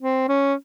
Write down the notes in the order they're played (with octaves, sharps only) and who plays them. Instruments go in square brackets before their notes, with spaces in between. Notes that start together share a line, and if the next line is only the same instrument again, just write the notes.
[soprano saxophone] C4
C#4